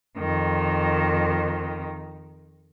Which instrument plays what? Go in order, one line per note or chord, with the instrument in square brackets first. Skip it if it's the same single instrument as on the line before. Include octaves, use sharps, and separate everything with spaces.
[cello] F2 D#3